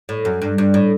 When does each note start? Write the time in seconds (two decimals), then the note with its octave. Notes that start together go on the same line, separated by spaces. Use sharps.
0.09 A2
0.25 F#2
0.42 G2
0.58 G2
0.74 A2